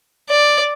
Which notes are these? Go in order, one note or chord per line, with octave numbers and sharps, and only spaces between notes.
D5